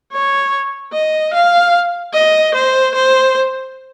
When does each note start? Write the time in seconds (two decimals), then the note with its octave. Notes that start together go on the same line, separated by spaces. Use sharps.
0.13 C#5
0.93 D#5
1.34 F5
2.14 D#5
2.55 C5
2.95 C5